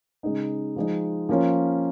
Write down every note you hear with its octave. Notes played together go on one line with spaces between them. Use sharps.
C#3 G#3 D#4
F3 G#3 D#4
F3 A#3 C#4 F4